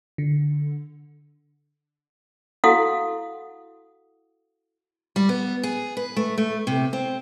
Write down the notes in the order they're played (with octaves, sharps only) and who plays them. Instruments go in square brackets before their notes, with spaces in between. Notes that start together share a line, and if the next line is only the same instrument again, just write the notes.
[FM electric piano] D3
[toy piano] E4 F#4 A4 F5 F#5 D#6
[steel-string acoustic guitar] G3
B3
G#4
B4
A3
A3
C3
C4